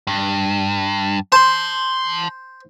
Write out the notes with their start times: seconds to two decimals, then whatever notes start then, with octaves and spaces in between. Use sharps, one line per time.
0.07 G2
1.32 C5 A5 C6